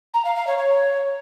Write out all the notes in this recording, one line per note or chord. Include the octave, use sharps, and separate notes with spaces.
A#5
F5
F5
C#5
C#5